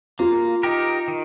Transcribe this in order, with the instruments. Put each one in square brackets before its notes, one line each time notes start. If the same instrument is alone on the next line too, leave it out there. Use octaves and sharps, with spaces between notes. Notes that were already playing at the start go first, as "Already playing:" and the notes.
[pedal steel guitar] A#3 [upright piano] F4
[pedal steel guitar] D#4 G4 A#4
D#3